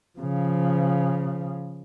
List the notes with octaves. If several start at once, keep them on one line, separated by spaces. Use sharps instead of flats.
C#3 F3